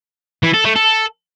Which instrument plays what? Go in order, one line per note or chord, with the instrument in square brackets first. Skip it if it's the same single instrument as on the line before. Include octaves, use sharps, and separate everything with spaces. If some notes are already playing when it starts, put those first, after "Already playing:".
[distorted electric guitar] E3
A4
A3
A4